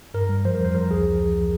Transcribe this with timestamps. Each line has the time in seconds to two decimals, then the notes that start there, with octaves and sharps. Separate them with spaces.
0.14 G2 A#4
0.29 G3
0.45 F3 C5
0.54 A#4
0.60 F2 C5
0.75 F3 A#4
0.90 C#2 G#4